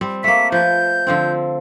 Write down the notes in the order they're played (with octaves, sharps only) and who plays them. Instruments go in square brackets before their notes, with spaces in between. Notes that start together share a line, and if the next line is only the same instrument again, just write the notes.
[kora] G3 C4
[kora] A3 A#3 [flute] B6
[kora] F3 B4 [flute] G6
[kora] D3 F3 C4